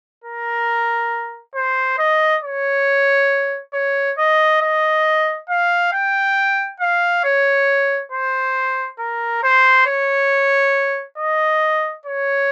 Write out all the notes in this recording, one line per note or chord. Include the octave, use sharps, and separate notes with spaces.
A#4
C5
D#5
C#5
C#5
D#5
D#5
F5
G5
F5
C#5
C5
A#4
C5
C#5
D#5
C#5